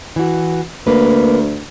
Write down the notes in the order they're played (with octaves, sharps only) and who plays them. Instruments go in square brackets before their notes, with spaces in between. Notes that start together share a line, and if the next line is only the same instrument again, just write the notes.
[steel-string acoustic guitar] E3 F#4
[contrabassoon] D2 [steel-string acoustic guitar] A#3 B4